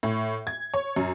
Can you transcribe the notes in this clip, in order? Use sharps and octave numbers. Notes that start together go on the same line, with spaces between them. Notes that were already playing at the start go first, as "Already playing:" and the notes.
A2
G#6
C#5
F#2